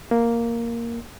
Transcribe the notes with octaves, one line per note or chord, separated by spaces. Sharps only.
A#3